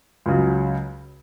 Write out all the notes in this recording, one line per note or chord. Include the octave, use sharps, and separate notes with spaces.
C#2 C#3 F#3